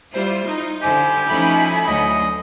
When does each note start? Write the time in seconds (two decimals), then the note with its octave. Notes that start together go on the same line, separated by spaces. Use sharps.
0.13 G3 E4 F4 C5
0.47 D#4
0.82 D3 E4 G4 C5 G#5
1.29 F3 A3 C#4 D#4 E4 B5
1.87 D2 D3 F#3 D#5